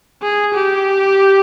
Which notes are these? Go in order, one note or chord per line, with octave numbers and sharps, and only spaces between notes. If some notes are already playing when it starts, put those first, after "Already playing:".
G#4
G4